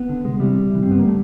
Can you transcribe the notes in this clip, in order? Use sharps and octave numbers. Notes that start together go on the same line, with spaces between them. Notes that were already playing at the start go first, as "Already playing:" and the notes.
Already playing: B3
D3
C2 G#3
C3 E3 G3
C2
C3 E3
G2 C4
B3
D3 A#3
A3